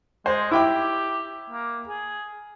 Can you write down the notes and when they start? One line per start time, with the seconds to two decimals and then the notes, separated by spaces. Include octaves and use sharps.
0.26 G#3 C5
0.51 E4 G4 G5 D6
1.50 A#3
1.88 G#4